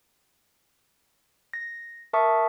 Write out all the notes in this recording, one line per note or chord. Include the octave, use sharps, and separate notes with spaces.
A#6
A#4 E5 A5 C#6 D#6